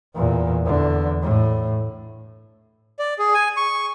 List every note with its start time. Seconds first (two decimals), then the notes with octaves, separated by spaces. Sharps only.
0.15 E2 A#2
0.65 E2 D3
1.22 A2
2.99 D5
3.19 G#4
3.34 G#5
3.57 C#6